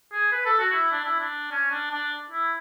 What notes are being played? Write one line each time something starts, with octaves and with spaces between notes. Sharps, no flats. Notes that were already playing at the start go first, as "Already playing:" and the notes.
G#4
B4
A4
F#4
E4
D4
E4
D4
C#4
D4
D4
E4